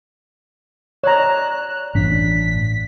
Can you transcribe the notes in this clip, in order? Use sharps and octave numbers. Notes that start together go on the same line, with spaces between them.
C#5 D5 A#5 F#6 G#6 E7
A1 G2 D4 B6